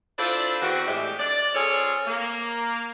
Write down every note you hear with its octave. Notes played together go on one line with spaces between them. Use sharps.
D4 E4 F4 A4 C5 D5
E2 C4 F#4
A2 G3 G#3 G4 E5
D5
C4 F4 G#4 A4 C#5
A#3